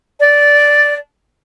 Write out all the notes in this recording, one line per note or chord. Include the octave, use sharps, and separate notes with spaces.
D5